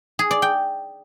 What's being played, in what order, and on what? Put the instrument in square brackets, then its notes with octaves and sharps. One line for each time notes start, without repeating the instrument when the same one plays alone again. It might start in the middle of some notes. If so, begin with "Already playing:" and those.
[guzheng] G#4
D5
G5